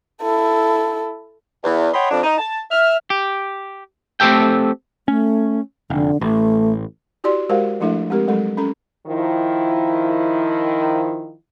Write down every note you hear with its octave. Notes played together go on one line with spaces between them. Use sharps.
E4 A4
E2
C#5 D#5 F#5 G5 B5 C6
F2 D4
D#4
A5
E5 F6
G4
A3 C4 G4 A4 G5
A3 C#4
F1 D3
A1 A3
E4 F#4 G4 D5 C6
G#3 F#4 G4 A#4 C5 F5
F3 A3 D4 E4 A4 E5
G#3 C4 G4 A#4
F#3 G#3 A4
C#4 A4 A#5
D#3 F3 E4